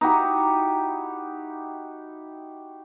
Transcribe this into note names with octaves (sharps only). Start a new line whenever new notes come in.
D#4 E4 F#4 G4